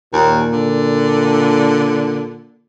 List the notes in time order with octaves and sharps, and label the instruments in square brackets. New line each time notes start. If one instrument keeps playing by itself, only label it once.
[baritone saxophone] D#2 [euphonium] A#2
[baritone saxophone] D3